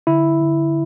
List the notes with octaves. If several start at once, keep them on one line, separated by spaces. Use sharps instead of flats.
D3 E4
D3